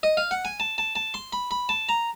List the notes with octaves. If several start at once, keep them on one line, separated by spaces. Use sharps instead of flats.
D#5
F5
F#5
G#5
A5
A5
A5
C6
B5
B5
A5
A#5